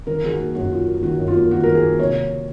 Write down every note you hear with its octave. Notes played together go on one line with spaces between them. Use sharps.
D#3 A#4
D#3 G#4
F#4
A#3
F#2 F#4
F4
A#3
D#3 F#4
F#2
F4
A#3
D#3 F#4
D#3 A#4
G#4
A#3
C3 C#5